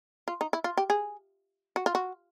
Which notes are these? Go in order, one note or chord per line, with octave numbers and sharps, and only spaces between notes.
F4
D#4
E4
F4
G4
G#4
F#4
F4
F#4